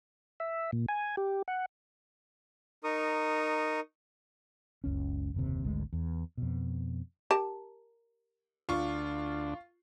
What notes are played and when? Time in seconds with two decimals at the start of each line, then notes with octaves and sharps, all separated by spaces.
0.40 E5
0.72 A#2
0.89 G#5
1.17 G4
1.48 F#5
2.84 D#4 A#4 C#6 D#6
4.84 F#1 C#2 C#4
5.34 F#1 D#2 C3
5.64 G#1 D2 G#3
5.93 E2
6.37 F2 B2
7.31 G4 A#4 A5
8.69 D2 D4 F4 C#6